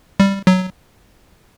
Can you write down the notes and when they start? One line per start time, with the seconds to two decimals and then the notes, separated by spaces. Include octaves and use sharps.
0.20 G3
0.47 F#3